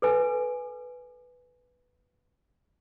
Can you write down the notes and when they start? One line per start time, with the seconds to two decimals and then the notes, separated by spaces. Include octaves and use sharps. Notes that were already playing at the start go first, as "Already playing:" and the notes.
0.02 A4 B4 G#5